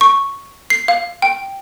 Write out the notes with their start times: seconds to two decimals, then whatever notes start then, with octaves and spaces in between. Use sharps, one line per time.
0.01 C#6
0.70 C7
0.88 F5
1.22 G5